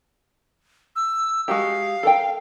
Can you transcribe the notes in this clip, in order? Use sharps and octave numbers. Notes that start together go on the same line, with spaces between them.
E6
G#3 F#4 G4 F5
A4 A#4 G5